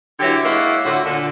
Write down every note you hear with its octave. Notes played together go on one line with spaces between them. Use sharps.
D3 F#3 E4 G4
G#3 A#3 E4 C#5 F#5
D2 A2 D3 F4 F#4
A#2 D3